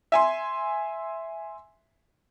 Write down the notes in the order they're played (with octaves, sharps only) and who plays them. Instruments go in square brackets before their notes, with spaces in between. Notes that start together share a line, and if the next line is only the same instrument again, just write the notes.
[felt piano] E5 G#5 C6